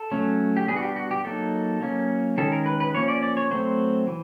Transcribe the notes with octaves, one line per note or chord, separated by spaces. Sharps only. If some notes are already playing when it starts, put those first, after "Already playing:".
Already playing: A4
F#3 A3 C#4
G4
G3 B3 D4 G#4
F#4
G4
F#4
G4
F#3 A#3 D#4 A4
F#3 A#3 C#4
D#3 G#3 C#4 A4
A#4
B4
B4
F3 A#3 C#4 C#5
D5
D5
C#5
F#3 A3 C4 C5
E3